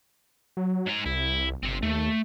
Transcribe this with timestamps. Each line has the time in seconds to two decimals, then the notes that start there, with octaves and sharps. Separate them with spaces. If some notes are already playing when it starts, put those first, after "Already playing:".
0.57 F#3
0.86 G#2 A#5
1.06 C2 E4
1.63 G1 C4 G4
1.83 D#2 A3